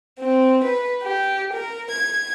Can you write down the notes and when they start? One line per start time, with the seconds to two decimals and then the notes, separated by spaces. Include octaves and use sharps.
0.18 C4
0.64 B4
1.03 G4
1.53 A#4
1.91 G#6